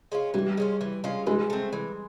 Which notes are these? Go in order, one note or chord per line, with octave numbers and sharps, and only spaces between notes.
G#3 C#4 F4
E3 G3
G#3 C#4 F4
E3
G#3 C#4 F4
E3 G#3
A3 C4
E3